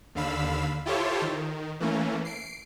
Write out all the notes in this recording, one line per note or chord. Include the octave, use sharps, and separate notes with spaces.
D#2 D3 F5 B5 E6
E4 F4 G4 A4 C5 C#5
D#3
E3 A3 A#3 C#4
C7 D7